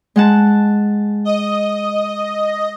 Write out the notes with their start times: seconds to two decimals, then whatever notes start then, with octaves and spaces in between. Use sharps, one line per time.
0.16 G#3 F#5 A5
1.25 D#5